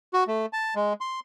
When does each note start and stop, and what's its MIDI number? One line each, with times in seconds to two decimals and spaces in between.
0.13 0.24 66
0.27 0.46 57
0.53 0.74 81
0.75 0.93 56
1.01 1.20 84